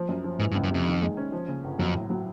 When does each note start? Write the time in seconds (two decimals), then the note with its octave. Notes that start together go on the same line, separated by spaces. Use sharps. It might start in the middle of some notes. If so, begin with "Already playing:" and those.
Already playing: F3
0.09 F#2
0.24 F3
0.39 G#2 E3
0.51 G2
0.55 C#2
0.63 F#2
0.71 F2 C3
0.87 D#3
1.02 G#3
1.17 C#4
1.32 F3
1.48 C#3
1.64 G1
1.79 F2 F#3
1.95 A2
2.10 F#3